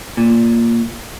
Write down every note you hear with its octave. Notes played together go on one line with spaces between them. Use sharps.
A#2